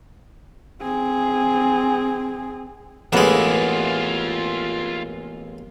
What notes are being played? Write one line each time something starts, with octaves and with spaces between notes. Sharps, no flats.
C4 G#4
A1 G#3 A#3 B3 F4 E5